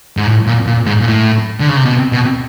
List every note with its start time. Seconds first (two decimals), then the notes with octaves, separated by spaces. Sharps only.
0.17 G#2
0.27 A2
0.47 A#2
0.67 A#2
0.86 G#2
1.01 A#2
1.07 A2
1.60 D3
1.69 C#3
1.77 C3
1.85 B2
2.12 B2